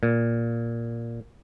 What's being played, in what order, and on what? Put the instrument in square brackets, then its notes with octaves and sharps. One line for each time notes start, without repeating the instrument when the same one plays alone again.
[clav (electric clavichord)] A#2